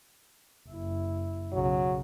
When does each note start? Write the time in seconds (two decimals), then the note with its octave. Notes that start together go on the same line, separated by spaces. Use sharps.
0.68 F#1 E4
1.53 B1 C#3 F#3